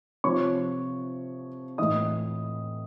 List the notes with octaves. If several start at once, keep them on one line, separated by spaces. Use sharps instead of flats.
C3 F3 C#5 C#6
A2 E3 D#5 D#6